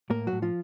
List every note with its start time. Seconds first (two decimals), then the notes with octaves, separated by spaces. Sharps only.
0.10 A2 A#3 A#4
0.27 F#3 F#4
0.32 A2
0.42 F3 F4